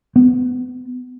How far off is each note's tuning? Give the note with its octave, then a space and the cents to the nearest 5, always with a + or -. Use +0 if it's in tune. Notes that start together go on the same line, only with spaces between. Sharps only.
B3 +25